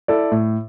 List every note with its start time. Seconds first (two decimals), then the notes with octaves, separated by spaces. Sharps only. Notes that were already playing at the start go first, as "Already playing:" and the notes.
0.08 E4 A4 D5
0.32 A2